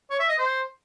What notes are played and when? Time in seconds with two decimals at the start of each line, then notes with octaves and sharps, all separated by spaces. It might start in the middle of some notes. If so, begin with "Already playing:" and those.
0.10 C#5
0.20 E5
0.29 D#5
0.38 C5